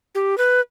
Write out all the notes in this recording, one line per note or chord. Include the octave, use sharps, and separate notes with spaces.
G4
B4